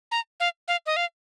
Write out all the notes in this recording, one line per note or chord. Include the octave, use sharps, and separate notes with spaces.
A#5
F5
F5
D#5
F5